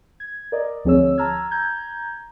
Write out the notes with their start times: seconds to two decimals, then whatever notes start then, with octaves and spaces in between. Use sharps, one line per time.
0.20 G#6
0.52 A#4 D5 D#5
0.84 D2 F3 C4 G#4 C#5 E6
1.18 A5 A#5 E6 F6 G#6
1.51 A#5 G6 G#6